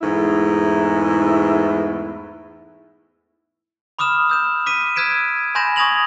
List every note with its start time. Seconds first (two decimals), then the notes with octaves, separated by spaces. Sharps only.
0.02 E2 G#2 A3 E4
3.99 B5 D6 D#6 F6 E7
4.29 E6 G6 E7
4.66 D6 B6 D#7
4.96 E6 F#6 G#6 B6 D7 E7
5.55 G#5 B5 C6 G6 A#6 E7
5.76 C#6 D#6 G#6 A#6 F7 F#7